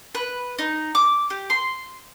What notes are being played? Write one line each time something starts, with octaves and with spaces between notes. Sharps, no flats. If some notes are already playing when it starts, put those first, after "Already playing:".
B4
D#4
D6
G4
C6